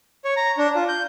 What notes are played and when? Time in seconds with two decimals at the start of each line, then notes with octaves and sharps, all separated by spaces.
0.25 C#5
0.37 A#5
0.58 D4
0.75 F4
0.88 G6